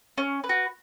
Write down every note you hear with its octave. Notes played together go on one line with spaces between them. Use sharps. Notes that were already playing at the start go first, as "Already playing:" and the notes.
C#4
B4
F#4